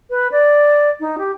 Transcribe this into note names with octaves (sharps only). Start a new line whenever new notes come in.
B4
D5
D#4
G4